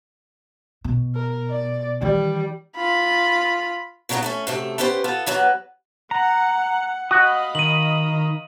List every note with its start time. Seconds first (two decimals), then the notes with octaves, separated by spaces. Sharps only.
0.84 B2
1.15 A#4
1.50 D5
2.02 D#3 E3 G3
2.76 F4 B5
4.09 A2 C#3 F#3 G3 B3 D#4
4.23 A3 B3 C#4
4.47 F#2 C3 A3
4.78 B3 C#4 G4 B4 C5
5.04 B3 F4 A4
5.26 E2 F#3 B3 B4
6.11 F#5 A#5
7.11 F#4 D#5 F5 B5 D#6
7.55 D#3 D#7 F#7